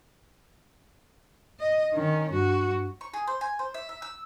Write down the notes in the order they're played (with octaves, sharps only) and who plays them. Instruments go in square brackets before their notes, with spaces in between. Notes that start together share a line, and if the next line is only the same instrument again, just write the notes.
[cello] D#5
D#3 C#4
G2 F#4
[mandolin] C#6
G#4
C5
G#5
C5
E5
E5
E6